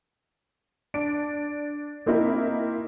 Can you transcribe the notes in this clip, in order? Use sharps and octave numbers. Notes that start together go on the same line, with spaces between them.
D4 D7
A#3 C4 D#4 E4 A#4